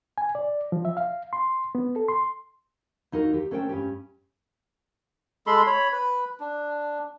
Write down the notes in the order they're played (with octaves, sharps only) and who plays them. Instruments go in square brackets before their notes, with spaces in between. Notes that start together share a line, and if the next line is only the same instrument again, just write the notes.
[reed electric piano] G#5
D5
F3
E5
F5
C6
B3
A4
C6
[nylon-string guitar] D#2 D#4 F#4 A#4
G4
A3 C#4 A#4 C5 F5 G5
G2 C#4 G4
[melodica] G#3 A4 B5 C6
C#5 B5
B4
D4